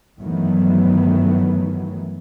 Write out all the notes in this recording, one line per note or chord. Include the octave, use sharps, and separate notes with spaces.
G2 D#3 E3 F#3 A3 B3